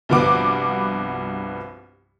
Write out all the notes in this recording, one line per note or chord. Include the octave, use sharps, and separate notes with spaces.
C2 G2 F3 B3 F#4 D6